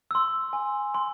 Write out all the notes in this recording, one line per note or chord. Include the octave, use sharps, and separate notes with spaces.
C6 E6
G#5
C6